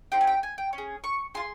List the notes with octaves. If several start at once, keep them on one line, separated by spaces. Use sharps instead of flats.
C4 D#4 G4 G5
G#5
G5
G#5
G5
C#4
G#4
C#6
F4 G#4 C6